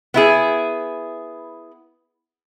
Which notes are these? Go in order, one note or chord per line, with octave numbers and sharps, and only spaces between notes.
B3 E4 G#4